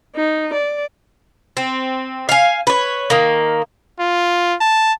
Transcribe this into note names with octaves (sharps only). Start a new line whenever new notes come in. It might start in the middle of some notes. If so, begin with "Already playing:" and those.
D#4
D5
C4
F5 G#5
B4 C#5
D#3 A#3
F4
A5